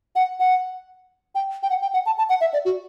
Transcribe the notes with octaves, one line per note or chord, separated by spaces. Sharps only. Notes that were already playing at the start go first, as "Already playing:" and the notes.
F#5
F#5
G5
G5
F#5
G5
F#5
A5
A5
F#5
E5
D5
F#4